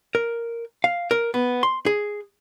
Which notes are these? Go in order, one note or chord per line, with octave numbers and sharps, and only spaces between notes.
A#4
F5
A#4
B3
C6
G#4